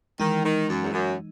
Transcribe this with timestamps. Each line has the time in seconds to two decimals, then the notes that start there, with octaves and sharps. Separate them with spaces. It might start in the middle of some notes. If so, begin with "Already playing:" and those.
0.20 D#3 E3 G#3 D#4
0.44 D#3
0.69 F#2
0.84 E2
0.93 F#2